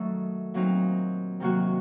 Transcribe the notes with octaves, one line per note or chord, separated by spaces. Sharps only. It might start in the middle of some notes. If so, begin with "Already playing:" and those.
Already playing: D#3 F#3 A3 D#4 A4
A#2 F#3 C4 D#4
C3 D#3 F#3 A#3 F#4